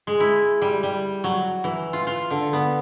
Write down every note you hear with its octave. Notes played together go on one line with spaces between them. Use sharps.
G#3
E4
G3
G3
F#3
E3
F4
F4
D3
B3